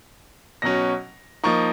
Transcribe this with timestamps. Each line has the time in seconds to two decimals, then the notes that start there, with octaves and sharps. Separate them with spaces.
0.62 B2 F#3 C#4 A#6
1.44 F3 A#3 D#4 C#6